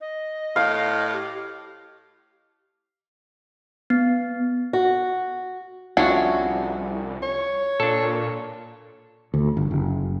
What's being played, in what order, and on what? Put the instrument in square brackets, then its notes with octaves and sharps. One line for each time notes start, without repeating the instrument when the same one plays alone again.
[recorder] D#5
[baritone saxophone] A2 [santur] F5
[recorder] G4
[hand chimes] B3
[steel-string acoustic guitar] F#4
[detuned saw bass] C2 [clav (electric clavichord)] F2 D4 [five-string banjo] C#4 E4 F#4
[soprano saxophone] C#5
[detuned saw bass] A#2 [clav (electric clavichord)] D4 A4
[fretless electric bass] D2
G1
F#1